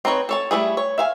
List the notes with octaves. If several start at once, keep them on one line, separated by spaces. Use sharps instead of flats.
C4 D#4 B4 C#5
A4 C#5 A5
G3 A3 E4 G#4
C#5
E5 F5 G#5